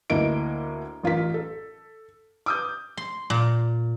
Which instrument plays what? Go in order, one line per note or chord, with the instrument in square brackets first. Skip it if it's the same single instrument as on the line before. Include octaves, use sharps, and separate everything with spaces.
[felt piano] D2 A#3 E4 D#5 D7
A1 F4 A#4 B6
A4
D6 D#6 G6
[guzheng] C6
A#2